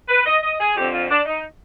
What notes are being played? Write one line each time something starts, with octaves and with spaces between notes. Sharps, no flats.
B4
D#5
D#5
G#4
F2 D3 F3 C4 G4
F4
D4
D#4